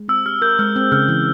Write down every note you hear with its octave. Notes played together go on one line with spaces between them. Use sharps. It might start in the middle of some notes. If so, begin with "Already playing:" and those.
Already playing: G#3
C4 E6
G4 F6
A#4 G6
G#3 F6
C4
C#3 F6
E3